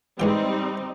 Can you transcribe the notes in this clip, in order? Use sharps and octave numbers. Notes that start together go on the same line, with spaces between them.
G#2 E3 G3 C4 D#4 G5